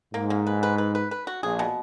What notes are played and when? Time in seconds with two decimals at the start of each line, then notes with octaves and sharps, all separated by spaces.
0.14 G#2 A#3
0.30 A#3
0.47 B4
0.63 B4
0.78 B4
0.95 B4
1.11 B4
1.27 F#4
1.43 A#1 A#2 G#4
1.59 B2